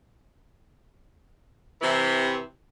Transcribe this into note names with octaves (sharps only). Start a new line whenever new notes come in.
C3 E3